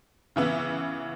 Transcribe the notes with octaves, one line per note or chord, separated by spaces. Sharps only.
C#3 E3 B3 E4